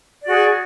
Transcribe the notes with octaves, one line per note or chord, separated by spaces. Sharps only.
F#4 G#4 D5